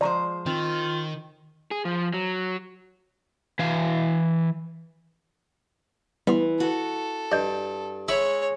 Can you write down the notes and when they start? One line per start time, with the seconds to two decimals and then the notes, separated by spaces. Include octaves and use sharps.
0.01 F3 G#3 C5 D5 A#5 C#6
0.46 D#3 C4 F4
1.71 G#4
1.85 F3
2.14 F#3
3.59 E3 F5
6.27 E3 G3 B3 C6
6.60 F#4 A4
7.32 G2 D5 D#5 G6
8.08 G#3 C#5 E5 B5 C#6